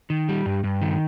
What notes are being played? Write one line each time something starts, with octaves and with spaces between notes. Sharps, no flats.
D#3
G3
G2
G2
D#3